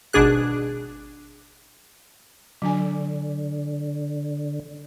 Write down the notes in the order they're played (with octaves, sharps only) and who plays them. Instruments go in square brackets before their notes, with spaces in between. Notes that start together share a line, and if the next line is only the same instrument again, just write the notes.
[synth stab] G#1 B2 D4 G#4 F#6
[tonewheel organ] D3 [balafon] F#3 D4 G#5